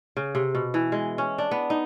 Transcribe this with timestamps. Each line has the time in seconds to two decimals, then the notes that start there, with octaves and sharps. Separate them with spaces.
0.17 C#3
0.35 C3
0.55 B2
0.74 E3
0.92 G#3
1.18 C#4
1.38 D4
1.51 B3
1.70 D#4